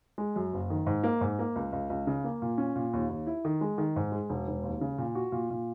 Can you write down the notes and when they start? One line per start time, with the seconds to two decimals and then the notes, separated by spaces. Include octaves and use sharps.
0.18 G#3
0.36 F#2
0.53 F#1
0.70 D#3
0.87 G#2
1.04 A#3
1.21 G#2
1.39 A#3
1.55 C#2
1.73 C#2
1.90 C#2
2.07 C#3
2.24 A#3
2.42 A#2
2.58 C#4
2.76 A#2
2.93 D#2
3.09 D#2
3.27 E4
3.45 D#3
3.61 G#3
3.78 D#3
3.96 G#2
4.12 G#3
4.29 E1
4.48 E1
4.64 D#2
4.81 C#3
4.98 A#2
5.15 F#4
5.32 A#2
5.50 A#2